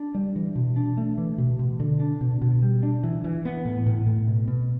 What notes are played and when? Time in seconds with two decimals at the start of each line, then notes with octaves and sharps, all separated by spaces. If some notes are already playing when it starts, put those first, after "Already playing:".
Already playing: D4
0.15 G3
0.36 E3
0.56 B2
0.76 D4
0.97 A3
1.18 E3
1.38 B2
1.59 B2
1.80 D3
2.00 D4
2.21 B2
2.41 B2
2.63 G3
2.83 D4
3.04 E3
3.24 E3
3.45 B3
3.65 A2
3.86 A2
4.06 A2
4.28 B2
4.48 B2